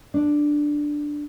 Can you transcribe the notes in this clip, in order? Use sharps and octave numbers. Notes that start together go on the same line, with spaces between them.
D4